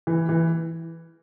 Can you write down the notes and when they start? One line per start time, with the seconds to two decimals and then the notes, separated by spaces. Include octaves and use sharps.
0.07 E3
0.29 E3